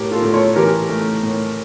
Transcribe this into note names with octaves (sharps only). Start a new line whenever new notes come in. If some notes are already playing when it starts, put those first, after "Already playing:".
Already playing: A2 G4 A#4
F4 A4
A2
A4 C#5
E3 G4 A#4
A3
A2